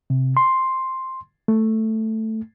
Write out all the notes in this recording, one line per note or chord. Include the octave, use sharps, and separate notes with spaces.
C3
C6
A3